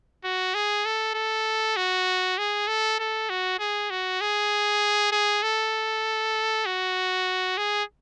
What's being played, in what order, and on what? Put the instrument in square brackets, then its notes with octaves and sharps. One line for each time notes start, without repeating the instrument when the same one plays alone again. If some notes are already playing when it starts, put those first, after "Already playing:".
[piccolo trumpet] F#4
G#4
A4
A4
F#4
G#4
A4
A4
F#4
G#4
F#4
G#4
G#4
A4
F#4
G#4